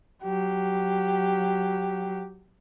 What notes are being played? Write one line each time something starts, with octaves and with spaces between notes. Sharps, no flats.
F#3 G4